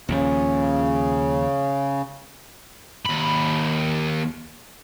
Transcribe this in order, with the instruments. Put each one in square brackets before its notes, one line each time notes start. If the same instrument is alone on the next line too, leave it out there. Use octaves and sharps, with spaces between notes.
[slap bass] D#2 A#2 F3 [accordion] C#3
[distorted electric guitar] D#2 B5